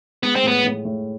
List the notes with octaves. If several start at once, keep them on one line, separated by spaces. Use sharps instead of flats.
G#3 B3
C4
A2 B3
A2
A2